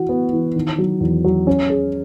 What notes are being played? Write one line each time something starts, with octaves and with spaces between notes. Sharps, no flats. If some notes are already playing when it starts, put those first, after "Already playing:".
Already playing: E3 F#4
B3
E3
D#3
F#3
E2
F#3
C#4
G#4